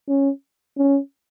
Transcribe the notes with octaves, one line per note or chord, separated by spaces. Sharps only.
C#4
C#4